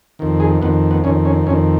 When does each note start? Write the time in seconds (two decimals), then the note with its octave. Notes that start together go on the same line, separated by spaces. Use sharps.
0.19 F2 D#3
0.40 G#4
0.62 F2 D#3 B3
0.91 B3
1.04 F2 D#3 C#4
1.25 C#4
1.46 F2 D#3 C#4